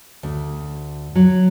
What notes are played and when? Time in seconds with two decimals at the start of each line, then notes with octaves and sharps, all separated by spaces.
0.23 D2
1.15 F#3